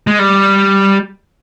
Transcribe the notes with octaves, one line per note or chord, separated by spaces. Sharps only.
G#3
G3